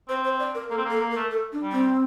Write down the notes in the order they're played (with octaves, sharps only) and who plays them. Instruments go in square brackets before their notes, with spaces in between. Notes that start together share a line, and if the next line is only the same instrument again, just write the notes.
[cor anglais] C4 [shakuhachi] C5
[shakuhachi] C5
D5
A#4
[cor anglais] A#3 [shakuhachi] A4
[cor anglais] C4
[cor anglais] A#3 [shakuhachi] A4
[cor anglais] A#3
[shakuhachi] A#4
[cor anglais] A3
[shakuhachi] A4
D4
[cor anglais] G3
[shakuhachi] C4